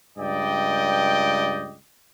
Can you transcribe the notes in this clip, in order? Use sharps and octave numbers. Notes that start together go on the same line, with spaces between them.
C#2 G2 D5 D#5 G5